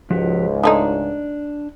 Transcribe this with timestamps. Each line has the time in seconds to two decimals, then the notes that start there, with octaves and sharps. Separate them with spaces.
0.10 C#2 G#2 F3 F#4 G4
0.63 F3 A3 D4 D#4